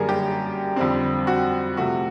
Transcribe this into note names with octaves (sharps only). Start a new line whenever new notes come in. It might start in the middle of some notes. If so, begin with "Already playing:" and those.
Already playing: F#2 D3 G3 A#3 G#4 A#4
G4
F2 D3 G3 C4
F#4
C3 F3 A3 F#4